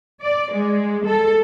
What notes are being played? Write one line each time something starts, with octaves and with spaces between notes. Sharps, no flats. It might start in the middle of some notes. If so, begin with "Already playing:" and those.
D5
G#3
A4